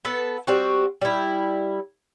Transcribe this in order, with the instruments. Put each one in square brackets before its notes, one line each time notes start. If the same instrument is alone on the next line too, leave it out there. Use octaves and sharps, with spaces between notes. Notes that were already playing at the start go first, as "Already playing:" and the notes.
[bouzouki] B3 A4
G3 C4 F#4
G3 E4